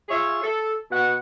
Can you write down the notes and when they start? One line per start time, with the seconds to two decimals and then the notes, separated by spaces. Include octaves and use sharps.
0.09 F4 G#4 C#5 E5
0.43 A4
0.91 B2 F#5